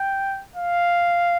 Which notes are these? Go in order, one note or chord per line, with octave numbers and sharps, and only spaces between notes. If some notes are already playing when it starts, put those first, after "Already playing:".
Already playing: G5
F5